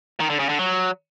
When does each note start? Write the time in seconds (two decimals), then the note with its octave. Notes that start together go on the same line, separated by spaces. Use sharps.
0.20 D#3
0.30 D3
0.39 C#3
0.49 D3
0.59 F#3